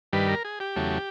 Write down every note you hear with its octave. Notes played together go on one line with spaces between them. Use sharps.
G2 D#3 G3 B4
A#4
G#4
G4
E2 C#3 F#3 A3